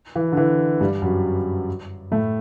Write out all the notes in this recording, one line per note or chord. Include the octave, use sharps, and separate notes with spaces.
E3
D3
E3
G2 G3
F#2 F#3
A2 A3